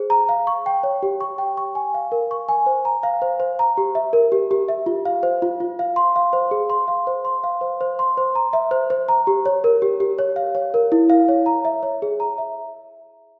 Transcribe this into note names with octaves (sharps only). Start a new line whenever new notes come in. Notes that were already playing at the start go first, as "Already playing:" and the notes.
Already playing: G#4 C5
A#5
F5
C#6
G5
C#5
G4
C#6
G5
C#6
G#5
F5
A#4
C#6
G#5
C5
A#5
F5
C5
C5
A#5
G4
E5
A#4
G4
G4
E5
F4
F5
C5
F4
F4
F5
C6
F5
C5
G#4
C6
F5
C5
C6
F5
C5
C5
C6
C5
A#5
E5
C5
C5
A#5
G4
C#5
A#4
G4
G4
C#5
F5
C#5
A#4
E4
F5
C#5
A#5
E5
C#5
G#4
A#5
E5